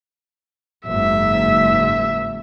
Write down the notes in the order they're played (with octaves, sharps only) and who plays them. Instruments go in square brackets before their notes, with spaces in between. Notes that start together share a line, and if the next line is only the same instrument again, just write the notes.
[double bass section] F#1 G#2 [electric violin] E5